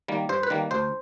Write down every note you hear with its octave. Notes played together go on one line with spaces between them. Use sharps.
D#3 G3 A#3
G2 C5
B4
D#3 G3 A#3
D2 C5